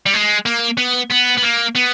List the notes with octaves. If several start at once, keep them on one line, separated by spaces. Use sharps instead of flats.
G3
G#3
A#3
B3
B3
B3
A#3
B3